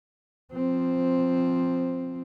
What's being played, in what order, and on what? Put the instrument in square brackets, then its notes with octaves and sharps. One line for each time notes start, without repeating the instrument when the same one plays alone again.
[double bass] F3 C4